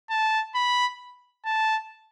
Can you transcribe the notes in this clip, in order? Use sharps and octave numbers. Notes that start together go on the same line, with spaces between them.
A5
B5
A5